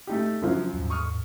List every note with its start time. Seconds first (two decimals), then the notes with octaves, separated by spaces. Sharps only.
0.07 A3 D#4 G4
0.42 F#2 C#3 F3 F#3 G#3 D4
0.73 D#2 G#2
0.90 C#6 D#6 F6